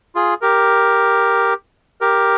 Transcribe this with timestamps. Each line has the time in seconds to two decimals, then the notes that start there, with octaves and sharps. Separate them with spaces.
0.15 F4 G#4
0.42 G4 A#4
2.01 G4 A#4